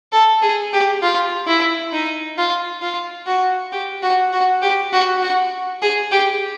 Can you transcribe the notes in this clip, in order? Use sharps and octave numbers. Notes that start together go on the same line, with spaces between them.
A4
G#4
G4
F4
E4
D#4
F4
F4
F#4
G4
F#4
F#4
G4
F#4
F#4
G#4
G4